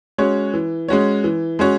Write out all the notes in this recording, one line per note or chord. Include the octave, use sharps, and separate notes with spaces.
G#3 C#4 F#4 C#5
E3
G#3 C#4 F#4 C#5
E3
G#3 C#4 F#4 C#5